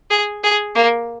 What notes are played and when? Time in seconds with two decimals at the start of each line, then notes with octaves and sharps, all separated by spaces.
0.10 G#4
0.43 G#4
0.75 A#3